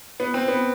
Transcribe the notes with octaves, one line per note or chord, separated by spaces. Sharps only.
B3
C4
B3